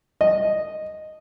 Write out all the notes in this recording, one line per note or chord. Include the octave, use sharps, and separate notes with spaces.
D#5